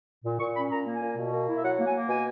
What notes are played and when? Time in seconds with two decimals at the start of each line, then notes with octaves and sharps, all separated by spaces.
0.23 A#2
0.39 A#2 C#6
0.54 C#4 B5
0.70 A#2 A#5
0.85 A#3
0.93 G#5
1.01 A#2
1.16 B2
1.32 A#3
1.47 E4
1.56 E5
1.63 F#3 F#5
1.78 A#3
1.86 G#5
1.94 A#3
2.09 B2 G#5